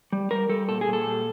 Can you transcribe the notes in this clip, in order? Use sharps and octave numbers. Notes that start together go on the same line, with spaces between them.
G3
G3 A#4
G3 A4
A#2 A4
G#4
A#2
A4
G3